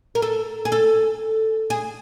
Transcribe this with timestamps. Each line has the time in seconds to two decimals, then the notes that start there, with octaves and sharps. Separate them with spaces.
0.15 A#4
0.22 A4
0.65 G#4
0.72 A4
1.70 G#4